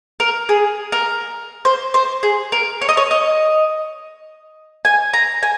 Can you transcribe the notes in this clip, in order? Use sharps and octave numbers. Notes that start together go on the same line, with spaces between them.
A#4
G#4
A#4
C5
C5
G#4
A#4
C#5
D#5
C#5
D#5
G#5
A#5
G#5